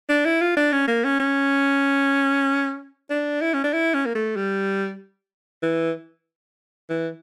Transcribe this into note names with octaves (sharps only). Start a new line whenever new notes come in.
D4
E4
F4
D4
C#4
A#3
C#4
C#4
D4
E4
C#4
D4
E4
C#4
A#3
A3
G3
E3
E3